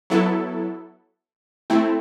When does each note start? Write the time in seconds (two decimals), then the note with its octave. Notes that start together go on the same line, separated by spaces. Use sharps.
0.10 F#3 B3 E4 A4
1.70 A3 C4 E4